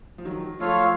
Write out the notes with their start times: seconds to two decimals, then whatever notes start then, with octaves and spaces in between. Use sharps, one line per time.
0.18 F3
0.25 D#3 F#3
0.60 F3 A3 F4 A4 C#5 F5